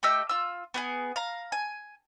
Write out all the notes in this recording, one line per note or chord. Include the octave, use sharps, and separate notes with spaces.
A3 G4 D#5 E6
F4 E6
B3 G4 G#4
F5 A#5
G#5